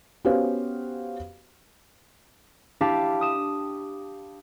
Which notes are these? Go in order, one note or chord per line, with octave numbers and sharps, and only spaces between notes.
B3 C#4 F#4 G4 C5 F5
D4 E4 G4 F5 A5
D#6 E7